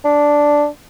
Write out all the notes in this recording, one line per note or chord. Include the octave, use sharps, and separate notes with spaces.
D4